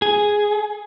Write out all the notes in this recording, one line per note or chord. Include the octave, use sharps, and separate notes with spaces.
G#4